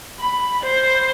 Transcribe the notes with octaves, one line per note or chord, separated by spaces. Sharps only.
B5
C5